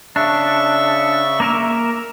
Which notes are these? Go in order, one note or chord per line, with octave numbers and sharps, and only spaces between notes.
C#3 D4 E5 C#6
A#3 A#4 E5